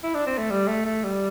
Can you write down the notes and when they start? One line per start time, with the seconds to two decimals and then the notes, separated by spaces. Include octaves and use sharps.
0.03 E4
0.15 D4
0.26 C4
0.38 A3
0.51 G3
0.68 A3
0.86 A3
1.04 G3